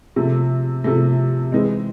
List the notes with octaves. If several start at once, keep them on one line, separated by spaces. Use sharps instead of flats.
C3 F3 A3
C3 F3 A3
E3 G#3 C4 D#4